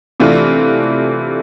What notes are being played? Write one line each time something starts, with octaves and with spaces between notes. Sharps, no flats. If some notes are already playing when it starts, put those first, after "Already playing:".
C3 E3 A3 D4 F4